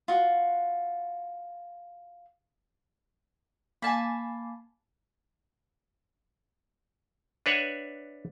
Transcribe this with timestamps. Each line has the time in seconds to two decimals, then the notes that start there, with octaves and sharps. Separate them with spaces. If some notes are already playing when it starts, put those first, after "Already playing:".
0.08 F4 F#4
3.82 A#3 G#5 A5 B5
7.46 D4 B4 C#5 E5 F#5